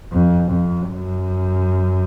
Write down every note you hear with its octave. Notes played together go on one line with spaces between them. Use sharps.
F2
F2
F#2